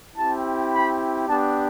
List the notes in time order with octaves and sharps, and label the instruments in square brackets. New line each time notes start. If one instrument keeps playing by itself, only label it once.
[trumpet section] C4 E4 G4 A5
B5
B3 D4 G4 A5